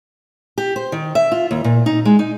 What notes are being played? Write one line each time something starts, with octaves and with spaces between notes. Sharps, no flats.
G4
C5
D#3
E5
F4
D#2
A#2
D#4
G#3
D#4